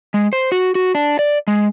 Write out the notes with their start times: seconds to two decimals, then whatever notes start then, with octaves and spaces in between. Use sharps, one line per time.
0.14 G#3
0.33 C5
0.52 F#4
0.75 F#4
0.95 D4
1.19 D5
1.48 G#3